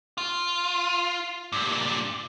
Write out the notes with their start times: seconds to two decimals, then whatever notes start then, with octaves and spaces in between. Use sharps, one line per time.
0.18 F4
1.52 G2 A#2